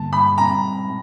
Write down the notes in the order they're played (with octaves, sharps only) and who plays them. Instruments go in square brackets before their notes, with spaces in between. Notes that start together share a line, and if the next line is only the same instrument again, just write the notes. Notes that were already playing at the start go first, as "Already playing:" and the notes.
Already playing: [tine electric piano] G2 D3 G3 A#3 [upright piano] A5
[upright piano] B5
[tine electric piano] A#2 G3 C4 [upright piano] A#5
[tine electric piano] G#3